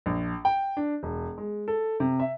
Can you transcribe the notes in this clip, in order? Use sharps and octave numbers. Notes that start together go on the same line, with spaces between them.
A#1
G5
D4
E1
G#3
A4
C3
E5